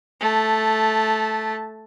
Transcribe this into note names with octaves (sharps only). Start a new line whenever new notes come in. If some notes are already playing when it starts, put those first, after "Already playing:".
A3 A5